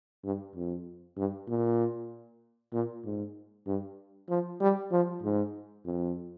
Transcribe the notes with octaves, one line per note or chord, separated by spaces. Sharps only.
G2
F2
G2
A#2
A#2
G#2
G2
F3
G3
F3
G#2
F2